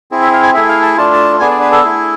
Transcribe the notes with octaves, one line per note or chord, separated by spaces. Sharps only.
C4 E4 G#4
E5
F5
G#5
A3 E4 G#4 E5
F5
A5
A3 D4 F4 A5
A5
B3 D4 G#4 G#5
D5
B4
A4
A3 E4 G#4